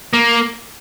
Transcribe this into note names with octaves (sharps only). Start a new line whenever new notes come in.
A#3